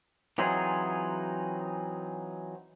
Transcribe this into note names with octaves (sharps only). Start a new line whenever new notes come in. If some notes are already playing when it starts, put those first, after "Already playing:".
E3 F#3 C4 D#4 F4 G#4